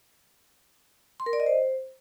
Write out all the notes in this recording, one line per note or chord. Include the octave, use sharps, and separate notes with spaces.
C6
A#4
D5
D#5
C5